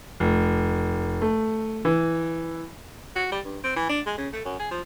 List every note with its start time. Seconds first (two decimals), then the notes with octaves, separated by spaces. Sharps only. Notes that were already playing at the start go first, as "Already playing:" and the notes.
0.20 F1
1.22 A3
1.85 E3
3.16 F#4
3.32 G3
3.45 G2
3.64 C4
3.76 E3
3.89 D4
4.06 G#3
4.18 C#3
4.33 A3
4.45 F#2
4.59 G#4
4.71 F3